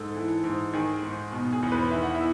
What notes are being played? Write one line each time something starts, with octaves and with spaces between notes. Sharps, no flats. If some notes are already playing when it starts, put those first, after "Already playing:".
Already playing: G#2 A4
E3
G#2
D#3 G#4
G#2
B2
G#4
E2
B3 B4
D#3 E5
F#5
E4 E5